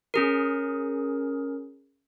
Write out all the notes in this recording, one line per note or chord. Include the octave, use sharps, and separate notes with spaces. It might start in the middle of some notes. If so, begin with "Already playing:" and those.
C#4 G#4 A#4